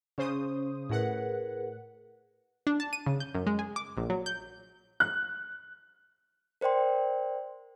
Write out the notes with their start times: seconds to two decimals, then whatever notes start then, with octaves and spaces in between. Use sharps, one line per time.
0.18 C#3 C#4 C5 D#6
0.90 A2 G#4 A#4 B4 F#5
2.67 D4
2.80 A5
2.93 D#7
3.06 C#3
3.20 G6
3.34 F#2
3.47 G#3
3.59 G#4
3.76 D6
3.97 A#1
4.10 F#3
4.26 G6
5.00 F#6
6.61 A#4 C5 D5 G5 C6